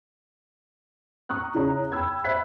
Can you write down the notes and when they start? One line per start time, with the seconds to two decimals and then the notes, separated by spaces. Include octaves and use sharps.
1.29 A#5 C#6 D#6 F6 F#6
1.54 C#3 E4 G#4 C#5 A#5
1.92 G5 B5 E6 G#6
2.24 C5 E5 B5 F#6 G#6 B6